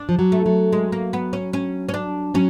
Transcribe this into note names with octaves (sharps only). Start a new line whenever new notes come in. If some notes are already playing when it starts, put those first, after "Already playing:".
Already playing: D4
F3
F#3
A3
F#3
G#3
A#3
B3
C#4
C#4
C#4
D4
F#3 C#4